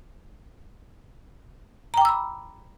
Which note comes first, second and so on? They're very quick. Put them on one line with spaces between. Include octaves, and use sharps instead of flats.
A#5 G5 D6 E6 B5